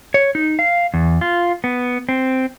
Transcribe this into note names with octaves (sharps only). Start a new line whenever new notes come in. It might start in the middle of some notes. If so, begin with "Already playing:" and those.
C#5
D#4
F5
E2
F4
B3
C4